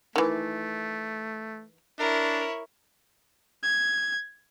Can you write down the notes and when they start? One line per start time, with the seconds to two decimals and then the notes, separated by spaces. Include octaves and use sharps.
0.16 D#3 E3 A3
1.99 D4 E4 A#4 C#5
3.63 G#6